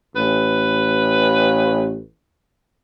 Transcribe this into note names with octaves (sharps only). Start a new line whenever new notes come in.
A1 B4